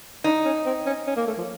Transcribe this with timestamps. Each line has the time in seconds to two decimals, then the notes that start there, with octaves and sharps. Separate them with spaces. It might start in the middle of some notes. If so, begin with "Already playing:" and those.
0.24 D4 D#4
0.45 C#4
0.66 C4
0.86 C#4
1.07 C#4
1.17 A#3
1.27 A3
1.38 F3